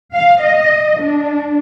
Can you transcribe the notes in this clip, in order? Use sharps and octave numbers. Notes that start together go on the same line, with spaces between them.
F5
D#5
D4